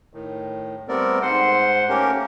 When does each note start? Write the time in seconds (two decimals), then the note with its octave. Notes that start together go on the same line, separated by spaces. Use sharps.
0.14 A2 D#3
0.88 G3 A3 B3 C4 A#4 D5
1.22 G#2 C5 F#5 C6
1.89 A3 A#3 C#4 G4 A#4